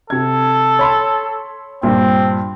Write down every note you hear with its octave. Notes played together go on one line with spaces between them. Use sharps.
C3 A4 G#6
C#5 B5 C6
G2 A#2 C4